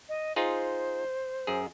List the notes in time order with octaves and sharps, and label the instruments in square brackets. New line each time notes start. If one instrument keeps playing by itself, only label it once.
[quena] D#5
[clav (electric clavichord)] D#4 F4 G#4 [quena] C5
[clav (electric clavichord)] F#2 G#4